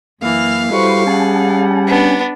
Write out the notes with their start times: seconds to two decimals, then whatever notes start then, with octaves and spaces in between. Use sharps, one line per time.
0.22 F#2 E3 A#3 F5 F6
0.72 G3 E4 F#4 A4 B4 C5 C#6
1.07 C#4 G#4 F#5 G#5 A5
1.87 B3 D4